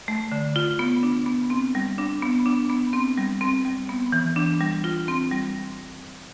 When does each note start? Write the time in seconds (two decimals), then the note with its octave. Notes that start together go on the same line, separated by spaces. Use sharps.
0.08 A3
0.32 D3
0.56 F4
0.79 B3
1.03 D4
1.26 B3
1.50 C4
1.75 G3
1.98 D4
2.22 B3
2.46 D4
2.70 B3
2.93 C4
3.18 G3
3.41 C4
3.65 G3
3.89 B3
4.12 E3
4.36 D4
4.61 G3
4.84 F4
5.08 C4
5.31 G3